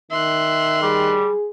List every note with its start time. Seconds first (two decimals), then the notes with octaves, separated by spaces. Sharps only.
0.11 D#3 E5 C6 F#6
0.82 G3 G#4